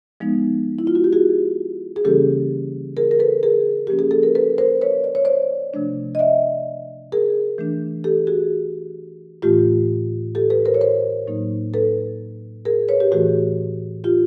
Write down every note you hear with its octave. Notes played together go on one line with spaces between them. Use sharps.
F3 G#3 B3 D#4
E4
F4
F#4
G4
F#4 G#4
G#4
C#3 E3 G3 A#3 C#4 G4 A4
G#4 A#4
A#4
A4 B4
G#4 A#4
F3 A#3 C#4 G4
G#4
A4
A#4
A4 B4
A#4 C5
B4 C#5
D5
C#5
C5 D5
C3 F3 A3 D4
D#5
D5 E5
G#4 A#4
E3 A3 D4
G4 A4
F#4 G#4
A2 E3 A3 F4 G4
G4 A4
A4 B4
A#4 C5
C#5
A#4 C5
A2 F#3 A#3 D#4
A4 B4
G#4 A#4
B4 C#5
G4
A2 E3 A3 F#4 G#4
F4 G4